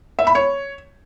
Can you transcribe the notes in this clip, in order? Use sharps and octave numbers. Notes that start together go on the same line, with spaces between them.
E5
B5
C#5